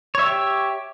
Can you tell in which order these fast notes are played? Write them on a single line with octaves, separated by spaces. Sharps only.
C#5 E5 G4